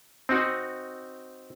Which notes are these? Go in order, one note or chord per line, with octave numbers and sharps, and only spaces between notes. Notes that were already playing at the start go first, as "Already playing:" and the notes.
C4 D#4 F#4